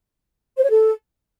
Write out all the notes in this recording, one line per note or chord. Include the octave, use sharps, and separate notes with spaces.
C5
C#5
A4